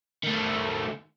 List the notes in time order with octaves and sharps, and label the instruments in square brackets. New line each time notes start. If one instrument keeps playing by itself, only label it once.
[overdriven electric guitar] D#3 A3